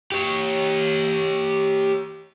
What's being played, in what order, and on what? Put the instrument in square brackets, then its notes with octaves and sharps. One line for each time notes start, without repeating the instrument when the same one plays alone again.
[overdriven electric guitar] G4 C#5